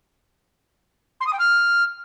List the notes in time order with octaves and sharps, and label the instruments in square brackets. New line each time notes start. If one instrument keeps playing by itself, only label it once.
[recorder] C6
D#6
G5
F6